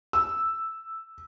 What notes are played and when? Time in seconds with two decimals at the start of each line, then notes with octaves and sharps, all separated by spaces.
0.13 E6